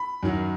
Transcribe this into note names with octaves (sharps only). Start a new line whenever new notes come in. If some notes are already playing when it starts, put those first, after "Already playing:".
Already playing: B5
F#2 D#3 F#3